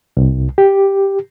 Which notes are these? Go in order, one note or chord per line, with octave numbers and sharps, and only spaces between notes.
C2
G4